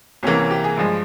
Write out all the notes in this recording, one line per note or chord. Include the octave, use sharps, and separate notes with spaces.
C2 C3 E3 A#3 C#4
C#4
G4
G#4
G2 F3 G#3 G#4